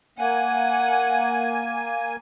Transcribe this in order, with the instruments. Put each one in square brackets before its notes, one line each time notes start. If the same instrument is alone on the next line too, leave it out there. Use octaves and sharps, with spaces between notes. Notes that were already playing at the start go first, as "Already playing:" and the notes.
[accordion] A#3 G#5 [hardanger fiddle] F#5